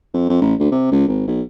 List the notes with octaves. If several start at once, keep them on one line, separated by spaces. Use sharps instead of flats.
F2
F2
A1
D2
C3
C#2
G#1
B1